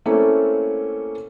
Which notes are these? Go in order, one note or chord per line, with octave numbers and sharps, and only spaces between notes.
A3 A#3 C4 C#4 E4 A4